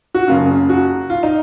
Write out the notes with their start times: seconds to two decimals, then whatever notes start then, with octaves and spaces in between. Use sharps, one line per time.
0.15 F#4
0.28 F#1 F#2 C#3 F4
0.69 F#4
1.10 F4
1.23 D#4